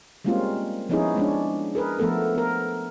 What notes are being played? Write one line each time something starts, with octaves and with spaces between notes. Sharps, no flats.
G3 G#3 A#3 C4 C#4 F4
F3 B3 C#4 D#4 E4 G#4
G#3 C#4 D4
G#4 A#4 B4
F3 A3 B3 A4 A#4
B3 A#4